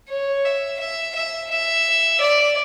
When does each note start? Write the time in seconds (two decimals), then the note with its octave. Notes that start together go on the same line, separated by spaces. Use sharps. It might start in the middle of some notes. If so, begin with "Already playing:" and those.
0.09 C#5
0.45 E5
0.80 E5
1.15 E5
1.51 E5
2.20 D5